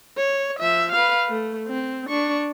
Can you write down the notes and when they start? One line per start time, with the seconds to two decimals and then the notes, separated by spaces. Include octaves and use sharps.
0.17 C#5
0.59 F3 E5
0.92 B4 F5
1.29 A3
1.68 C4
2.08 D4 C#6